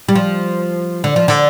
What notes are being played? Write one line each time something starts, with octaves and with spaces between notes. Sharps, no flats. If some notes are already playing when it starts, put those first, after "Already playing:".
G3
F3
D3
F3
D3